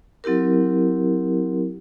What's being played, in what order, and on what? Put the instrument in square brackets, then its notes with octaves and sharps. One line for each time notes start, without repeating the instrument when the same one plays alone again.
[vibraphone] F#3 C4 E4 G4 A#4